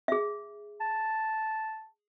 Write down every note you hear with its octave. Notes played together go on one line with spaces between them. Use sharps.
G#4 E5
A5